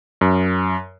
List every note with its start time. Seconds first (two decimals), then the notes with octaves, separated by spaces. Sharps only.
0.21 F#2